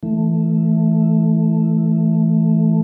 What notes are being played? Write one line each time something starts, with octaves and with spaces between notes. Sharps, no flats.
E3 A3